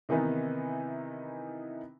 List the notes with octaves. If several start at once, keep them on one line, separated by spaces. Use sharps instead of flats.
C3 D#3 E3 B3 D#4